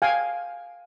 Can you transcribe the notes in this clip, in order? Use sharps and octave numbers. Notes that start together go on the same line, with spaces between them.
F5 G5 G#5